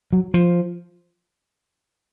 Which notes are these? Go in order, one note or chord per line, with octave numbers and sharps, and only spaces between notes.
F#3
F3